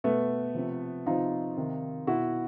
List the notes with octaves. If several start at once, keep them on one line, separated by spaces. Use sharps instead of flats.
B2 A3 B3
C3 F3
C3 F3 D#4 F4
C3 D#3
B2 E4 F#4